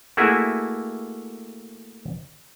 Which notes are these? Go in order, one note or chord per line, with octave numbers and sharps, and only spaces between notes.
A3 A#3 E4 F#4 G#4 E5